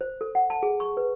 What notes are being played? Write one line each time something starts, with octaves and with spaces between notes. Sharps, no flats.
C5
A4
F#5
A5
G#4
C#6
B4